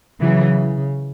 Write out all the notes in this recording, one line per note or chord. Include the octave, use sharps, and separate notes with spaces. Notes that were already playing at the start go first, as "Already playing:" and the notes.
C#3 E3 F#3